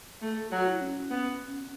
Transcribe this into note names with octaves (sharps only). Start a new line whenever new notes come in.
A3 A4
A4
F#3 F#4
E4
C#4
B3